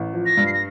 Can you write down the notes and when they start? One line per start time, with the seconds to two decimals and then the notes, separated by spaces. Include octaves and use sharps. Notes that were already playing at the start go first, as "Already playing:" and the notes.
Already playing: A1
0.13 F3
0.26 A#6
0.37 G2
0.47 C7
0.54 A#6